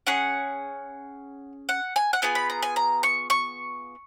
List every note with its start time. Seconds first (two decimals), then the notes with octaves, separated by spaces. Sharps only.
0.07 C#4 G#4 F#5
1.69 F#5
1.96 G#5
2.13 F#5
2.22 B3 F4 G#4 G#5
2.35 B5
2.50 A#5
2.63 G#5
2.76 A#5
3.03 C#6
3.30 C#6